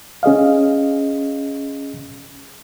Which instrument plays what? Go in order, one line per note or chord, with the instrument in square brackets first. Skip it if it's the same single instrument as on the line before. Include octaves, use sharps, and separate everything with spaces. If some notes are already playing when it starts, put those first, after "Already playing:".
[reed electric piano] C#4 G#4 D#5 F5